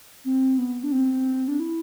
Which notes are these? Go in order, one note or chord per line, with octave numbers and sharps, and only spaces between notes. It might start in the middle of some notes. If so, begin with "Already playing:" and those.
C4
B3
D4
C4
D4
E4